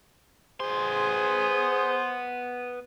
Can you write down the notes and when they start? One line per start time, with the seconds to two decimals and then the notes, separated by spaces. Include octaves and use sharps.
0.60 B3 G#4 C5 C6